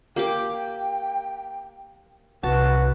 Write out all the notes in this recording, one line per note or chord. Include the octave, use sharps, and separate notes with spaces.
A#3 G4 G5 D6
C2 F#4 B4 A5